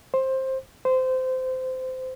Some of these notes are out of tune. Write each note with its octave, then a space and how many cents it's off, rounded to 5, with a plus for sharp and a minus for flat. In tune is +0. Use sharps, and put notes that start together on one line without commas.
C5 +15
C5 -20